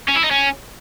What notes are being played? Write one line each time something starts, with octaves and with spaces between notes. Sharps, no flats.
C#4
E4
D#4
C#4